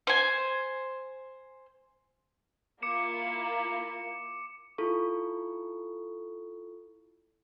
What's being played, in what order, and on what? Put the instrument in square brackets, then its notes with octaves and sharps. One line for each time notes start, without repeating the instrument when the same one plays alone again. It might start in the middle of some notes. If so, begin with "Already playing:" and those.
[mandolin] C5 G#5
[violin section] A#3 E4 F4 [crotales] D6 C#7 E7
[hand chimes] E4 F4 A4 C#6